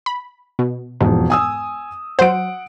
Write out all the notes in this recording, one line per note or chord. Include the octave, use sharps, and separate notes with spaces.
B5
B2
E1 F2 G#2
G#5 D#6 E6
F#3 C5 F#5 D7